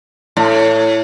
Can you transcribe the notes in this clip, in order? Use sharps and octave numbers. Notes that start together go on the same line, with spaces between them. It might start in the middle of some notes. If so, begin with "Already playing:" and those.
A2